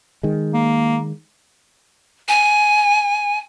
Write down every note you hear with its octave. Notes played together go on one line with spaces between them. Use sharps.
D#3 G#3
A#3
G#5